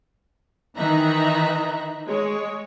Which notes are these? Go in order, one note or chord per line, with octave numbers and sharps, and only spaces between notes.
D#3 E3 D#4 E5 A#5 F#6
G#3 C#5